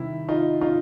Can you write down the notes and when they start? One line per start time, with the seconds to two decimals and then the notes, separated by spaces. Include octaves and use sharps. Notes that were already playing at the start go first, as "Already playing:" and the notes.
Already playing: C3 D#3 G3 E4
0.28 D#4 F4
0.61 D#4 F4